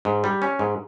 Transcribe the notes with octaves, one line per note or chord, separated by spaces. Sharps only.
G#2
G3
C#4
G#2